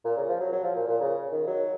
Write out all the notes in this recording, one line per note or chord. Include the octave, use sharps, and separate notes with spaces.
A#2
C#3
F3
F#3
F#3
F3
A#2
A#2
C#3
D#3
F#3